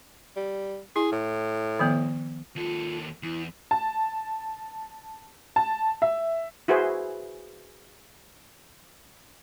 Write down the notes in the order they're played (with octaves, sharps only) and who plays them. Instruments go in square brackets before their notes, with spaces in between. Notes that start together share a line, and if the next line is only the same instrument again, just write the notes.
[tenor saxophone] G3
[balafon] E4 [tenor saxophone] G#4
[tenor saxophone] A2
[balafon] D#3 F3 B3
[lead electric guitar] D#2 A4 [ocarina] F4
[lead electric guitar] E2 [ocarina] E4
[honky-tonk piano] A5
A5
E5
[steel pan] E4 F#4 G#4 B4 C5